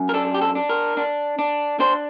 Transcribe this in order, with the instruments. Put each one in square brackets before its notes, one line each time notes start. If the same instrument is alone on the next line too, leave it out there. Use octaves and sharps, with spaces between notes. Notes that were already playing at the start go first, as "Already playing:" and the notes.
Already playing: [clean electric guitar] F#2
A#4
D4 A4
G4
A4
D4
A#4
D4
D4
D4 C5